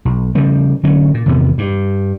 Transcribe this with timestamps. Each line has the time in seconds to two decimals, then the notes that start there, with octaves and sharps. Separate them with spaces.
0.05 B1
0.35 C#3 F3 G3 A3
0.83 D3 F#3 A3 C#4
1.14 A#2
1.26 G#1 E2 C3 B3
1.58 G2